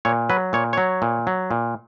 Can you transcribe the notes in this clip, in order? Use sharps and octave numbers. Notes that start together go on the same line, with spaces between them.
A#2 C#5
F#3 B4
A#2 C#5
F#3 C#5
A#2
F#3
A#2